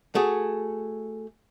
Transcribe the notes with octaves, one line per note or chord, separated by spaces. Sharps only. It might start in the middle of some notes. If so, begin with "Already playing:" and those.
A3 F#4 G#4